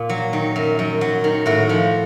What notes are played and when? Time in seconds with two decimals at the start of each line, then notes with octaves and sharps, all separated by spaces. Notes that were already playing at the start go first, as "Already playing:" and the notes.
Already playing: A#2
0.09 F#3
0.33 D#3
0.56 F#2
0.79 F#2
1.01 F#3
1.24 D#3
1.46 A2 F#4
1.69 F3